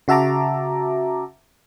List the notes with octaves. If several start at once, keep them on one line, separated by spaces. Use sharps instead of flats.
C#3 F#4 E5 A5 A#5 D6